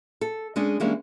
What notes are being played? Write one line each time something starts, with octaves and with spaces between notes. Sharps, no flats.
A4
G#3 C#4 D4 G#4
E3 G3 G#3 A#3 C#4 D4